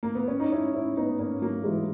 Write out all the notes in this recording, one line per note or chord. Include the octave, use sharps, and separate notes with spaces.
A#3
B3
C#4
D#4
C#4 E4
C#4 E4
B3 D#4
A#3 C#4
F#3 A#3
E3 G#3